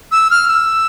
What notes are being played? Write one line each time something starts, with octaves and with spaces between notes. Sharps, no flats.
E6
F6
E6